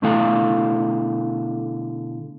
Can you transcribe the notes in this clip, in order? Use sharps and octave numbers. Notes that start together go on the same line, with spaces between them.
B2 D3 A3 E4 A4 F5